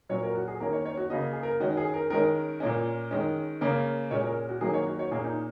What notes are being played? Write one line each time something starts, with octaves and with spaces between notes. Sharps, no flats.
A#2 F#3 C#4 C#5
A#4
F#4
G#4
D#3 A#3 C#4 A#4
C#5
C#5
F#4
C#3 A#3 C#4 D#5
G#4
A#4
D#3 G#3 C#4 F#4
G#4
A#4
D#3 G#3 C#4 A#4
A#2 A#3 C#4
D#3 G#3 C#4
C#3 A#3 C#4 A#4
A#2 G#3 C#4 C#5
A#4
F#4
D#3 F#3 A#3 C#4 G#4
C#5
F#4
C#5
A#2 A#3 C#4 G#4
D#4